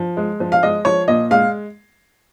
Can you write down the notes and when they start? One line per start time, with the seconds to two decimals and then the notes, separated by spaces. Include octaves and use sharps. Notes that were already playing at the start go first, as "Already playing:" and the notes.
Already playing: F3
0.17 G#3
0.40 F3
0.52 F5
0.63 G#3 D#5
0.85 F3 C#5
1.08 A#2 D#5
1.31 G#3 F5